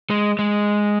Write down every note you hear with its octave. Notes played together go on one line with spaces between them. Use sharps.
G#3
G#3